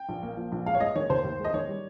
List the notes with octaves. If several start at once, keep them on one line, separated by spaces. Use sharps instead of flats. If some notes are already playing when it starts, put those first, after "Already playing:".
Already playing: G5
A#1
A#3
F3
A#1
G#3 F5
C#5
G#3 D#5
D#3 C#5
D#2 C5
D#2
G#3
D#5
D#3 C#5
G3